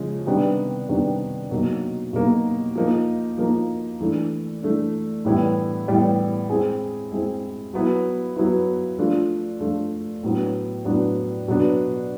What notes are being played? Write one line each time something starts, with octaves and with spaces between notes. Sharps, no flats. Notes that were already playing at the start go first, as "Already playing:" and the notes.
Already playing: C#3 F3 G#3
C3 D#3 G3 B3 D4
C3 D#3 G3 B3 D4
B2 F#3 A#3 D#4
B2 F#3 A#3 D#4
F3 A#3 D#4
F3 A#3 D#4
E3 A3 D4
E3 A3 D4
A2 E3 G3 B3 E4
A2 E3 G3 B3 E4
G#3 C4 E4 G#4
G#3 C4 E4 G#4
F#3 B3 E4
F#3 B3 E4
F3 A3 D4 F4
F3 A3 D4 F4
A2 F#3 B3 D4
A2 F#3 B3 D4
B2 F#3 B3 D4